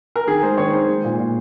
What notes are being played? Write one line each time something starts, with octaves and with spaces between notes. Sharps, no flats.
A#4
D#3 G#4
G#3 C5
D#3 C#5
D#3 C5
G#3
A#2
A#2